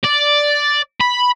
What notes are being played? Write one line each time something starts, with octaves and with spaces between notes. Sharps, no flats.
D5
B5